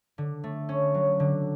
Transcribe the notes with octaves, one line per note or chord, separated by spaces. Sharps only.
D3
A3
C#4
F#3
D3